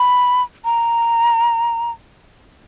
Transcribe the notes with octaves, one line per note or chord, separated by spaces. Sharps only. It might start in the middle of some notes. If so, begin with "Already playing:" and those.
Already playing: B5
A#5